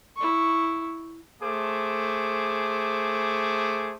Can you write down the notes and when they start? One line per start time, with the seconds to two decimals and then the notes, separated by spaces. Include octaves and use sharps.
0.17 E4 C#6
1.42 A3 G#4 C5 D6